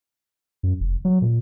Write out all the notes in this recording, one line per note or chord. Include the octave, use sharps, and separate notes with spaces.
F#2
F1
F#3
A#2